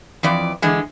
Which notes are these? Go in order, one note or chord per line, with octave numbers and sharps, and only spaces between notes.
F2 E3 D5
D3 E3 G#3